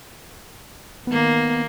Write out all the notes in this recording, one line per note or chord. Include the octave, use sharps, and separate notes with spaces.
D#3 A#3 B3